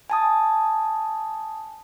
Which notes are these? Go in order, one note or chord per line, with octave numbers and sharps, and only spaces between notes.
G#5 A5 D#6